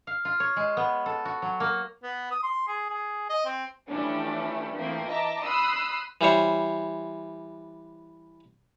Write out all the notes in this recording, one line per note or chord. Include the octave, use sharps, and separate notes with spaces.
F5
F4
C#5
G#3
B3
A4
F#4
F#3
A#3
B3
D#6
C6
G#4
G#4
D#5
C4
E3 F3 G3 A3 C#4 D4
E3 F3 A3 A#3 C4
D#5 E5 A5 A#5 D6
B5 C6 D#6 E6 F#6 C7
E3 G3 C5 C#5